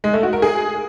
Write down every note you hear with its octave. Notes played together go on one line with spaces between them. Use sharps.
G#3
A3
F#4
A#4
G#4